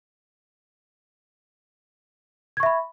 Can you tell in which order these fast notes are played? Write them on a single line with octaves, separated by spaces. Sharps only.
G#6 C#6 E5 B5